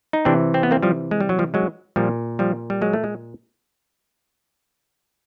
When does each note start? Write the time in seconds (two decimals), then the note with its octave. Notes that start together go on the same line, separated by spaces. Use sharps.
0.13 D#4
0.25 C3 E3 C4 D4
0.54 C4
0.63 B3
0.71 A#3 C4
0.83 F3 G3
1.11 G#3
1.21 G3
1.29 F#3
1.39 F3 G3
1.54 F#3 G#3
1.96 A#2 F3 G3
2.39 F3 G3
2.70 G3
2.81 F#3 G#3
2.93 A3
3.04 G#3